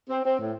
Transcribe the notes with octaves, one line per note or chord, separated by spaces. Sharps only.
C4
C4
A2